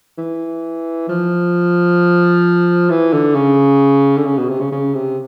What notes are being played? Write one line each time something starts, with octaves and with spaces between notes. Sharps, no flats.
E3
F3
E3
D3
C#3
D3
C#3
B2
C3
C#3
C#3
C3